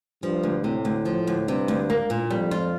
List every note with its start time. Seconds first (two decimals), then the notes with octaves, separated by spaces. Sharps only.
0.23 G2 F3
0.43 D2
0.64 A2 C3
0.85 D2
1.05 F3
1.27 D2
1.48 G2 C3
1.68 D2
1.90 A#3
2.10 A#2
2.30 F2 G3
2.51 F4